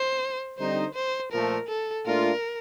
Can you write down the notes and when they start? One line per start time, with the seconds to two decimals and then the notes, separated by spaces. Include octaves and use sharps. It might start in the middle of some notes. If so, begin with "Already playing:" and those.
Already playing: C5
0.58 D3 G3 C4 D#4 C5
0.94 C5
1.32 A#2 F3 A3 A#4
1.68 A4
2.05 A#2 A3 D4 F4 A#4